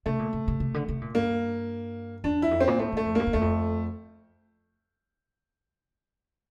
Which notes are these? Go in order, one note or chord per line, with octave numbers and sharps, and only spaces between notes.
C3 A3
A#2
C3
C3
C3
D3
C3
A#2
G2 A#3
E2 D4
E4
F2
C4
A#2
A2 A3
A2 A3
F2
G2 A#3
F2
E2 A3
F2